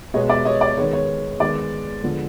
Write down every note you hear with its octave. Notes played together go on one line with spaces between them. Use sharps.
B2 G#3 B3 C#5 D#5
D5 E5
C#5 D#5
D5
D#3 G#3 B3 C#5
C#5
D#3 G#3 B3 D5
D3 F3 G#3 B3